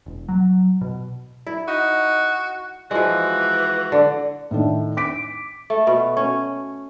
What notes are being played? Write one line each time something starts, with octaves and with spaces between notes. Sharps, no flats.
E1
F#3
B2
E4
D#4 F#4
E3 F3 G#3 F#4
D3
A2 D#3 D4
D6 B6 D7
A3
B2
C#4